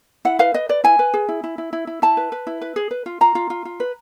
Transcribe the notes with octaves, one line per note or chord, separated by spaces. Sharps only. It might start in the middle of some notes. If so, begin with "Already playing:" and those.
E4 F#5
B4 F5
B4 D#5
B4 D5
E4 G#5
B4
G#4
E4
E4
E4
E4
E4
E4 A5
B4
B4
E4
B4
G#4
B4
F4
F4 A#5
F4
F4
F4
B4